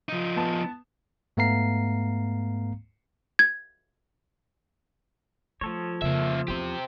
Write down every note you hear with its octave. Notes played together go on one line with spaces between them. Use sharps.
F3 D#4
B3 A5
G#2 A3 B3 F5 A#5 C7
G#6
F3 A3 A4 C#5
F2 C#3 A#3 E5
E2 A#3 G4 C5